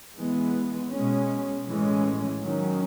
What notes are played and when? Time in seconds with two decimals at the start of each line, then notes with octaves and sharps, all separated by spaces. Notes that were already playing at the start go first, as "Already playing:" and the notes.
0.17 E3 G#3 B3
0.92 B2 G#3 C#4
1.67 A2 E3 G#3 C#4
2.41 D#3 F#3 C#4